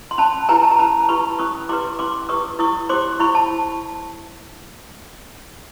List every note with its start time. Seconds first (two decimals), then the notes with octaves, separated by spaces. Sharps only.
0.11 C6
0.18 C#4 A5 B5
0.49 E4 G4 B4 G#5 A#5
0.64 A5
0.71 A#5
0.79 C#4 A5 B5
1.09 E4 G4 B4 B5 C#6
1.39 C#4 C#6 D#6
1.69 E4 G4 B4 C6 D6
1.99 C#4 C6 D6
2.29 E4 G4 B4 C#6 D#6
2.59 E4 C#6 D#6
2.89 G4 C5 C6 D6
3.19 E4 B5 C#6
3.35 A5